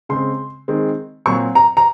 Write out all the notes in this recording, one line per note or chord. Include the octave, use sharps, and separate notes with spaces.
C#3 G#3 C4 C6
D#3 G#3 C4
A#2 F#3 C4 C#6
A#5
A#5